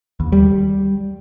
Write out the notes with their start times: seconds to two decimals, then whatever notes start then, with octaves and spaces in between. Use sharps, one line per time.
0.20 D#2
0.32 G3